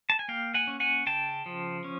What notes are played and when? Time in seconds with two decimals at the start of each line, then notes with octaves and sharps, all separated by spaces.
0.10 A5
0.19 G#5
0.28 A#3 F5 G5
0.54 F#5 G#5
0.67 C#4
0.80 F#5 G#5
1.06 C#3 G5 A5
1.46 F3
1.84 C#4